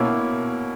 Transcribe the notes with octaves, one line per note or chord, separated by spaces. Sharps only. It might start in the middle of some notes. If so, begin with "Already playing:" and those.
Already playing: B2 A#3 C#4 E4